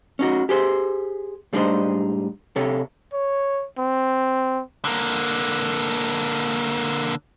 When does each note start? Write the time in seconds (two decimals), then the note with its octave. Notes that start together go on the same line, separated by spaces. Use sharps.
0.19 C#4 D#4 F#4
0.49 G4 G#4 C5
1.53 A2 G3 G#3 D4 D#4 C5
2.56 C3 A4 C#5
3.13 C#5
3.78 C4
4.85 D3 A#3